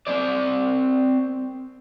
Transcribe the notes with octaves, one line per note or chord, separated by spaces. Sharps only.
C4 D5